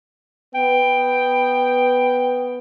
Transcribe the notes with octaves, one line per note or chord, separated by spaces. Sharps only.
B3 G5